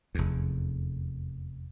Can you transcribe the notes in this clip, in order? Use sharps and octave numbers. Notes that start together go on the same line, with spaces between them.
F1 E2